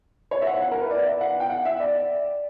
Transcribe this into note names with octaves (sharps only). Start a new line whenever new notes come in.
C#5
E5
F#5
F#5
A#4
B4
D5
E5
F#5
G5
F#5
E5
D5